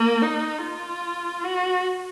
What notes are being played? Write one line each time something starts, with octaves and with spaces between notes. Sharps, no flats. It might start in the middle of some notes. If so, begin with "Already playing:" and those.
Already playing: A#3
D#4
F4
F#4